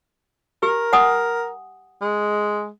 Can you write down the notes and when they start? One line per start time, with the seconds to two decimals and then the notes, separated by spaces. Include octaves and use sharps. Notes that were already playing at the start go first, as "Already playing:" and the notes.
0.63 G4 A#4
0.93 F#5 G#5 D#6
2.01 G#3